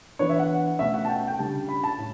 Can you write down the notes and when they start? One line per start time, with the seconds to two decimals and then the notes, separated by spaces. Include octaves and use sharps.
0.19 E3 B3 D4 C#5
0.29 E5
0.39 F#5
0.79 B2 A3 C#4 E5
0.94 F#5
1.05 A5
1.09 G5
1.28 G5
1.39 C#3 G3 D4 A5
1.69 B5
1.84 A5
1.98 A2